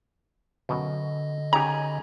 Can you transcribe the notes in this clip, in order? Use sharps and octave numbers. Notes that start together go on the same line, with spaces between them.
F#2 B2 D3 D#5
C#3 D#4 G4 G#5 A#5